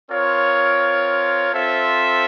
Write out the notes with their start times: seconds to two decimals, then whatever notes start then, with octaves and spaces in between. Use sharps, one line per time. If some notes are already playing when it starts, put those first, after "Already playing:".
0.10 C4 F4 A#4 C#5
1.53 C4 F4 A4 C5 E5